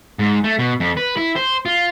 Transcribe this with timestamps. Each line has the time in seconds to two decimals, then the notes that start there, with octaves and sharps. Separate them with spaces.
0.19 G#2
0.44 A3
0.59 B2
0.80 F2
0.97 B4
1.17 E4
1.36 C5
1.66 F4